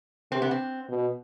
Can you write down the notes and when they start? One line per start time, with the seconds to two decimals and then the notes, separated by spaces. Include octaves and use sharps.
0.32 C3 C4
0.42 B3
0.51 C4
0.89 B2